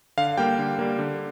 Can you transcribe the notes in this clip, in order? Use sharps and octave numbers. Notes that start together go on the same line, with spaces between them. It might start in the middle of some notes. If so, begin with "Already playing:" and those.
D3 F5
G3 A#3 G5
D3
G3 A#3
D3